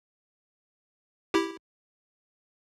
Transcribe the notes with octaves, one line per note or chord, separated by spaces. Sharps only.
E4 G4